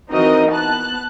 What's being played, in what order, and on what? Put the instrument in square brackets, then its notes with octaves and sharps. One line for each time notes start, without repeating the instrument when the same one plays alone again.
[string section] E3 C4 D#4 F#4 A#4 D#5
B3 A5 F#6